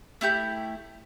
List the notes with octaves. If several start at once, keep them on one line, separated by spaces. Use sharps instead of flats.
A3 E4 G4 G6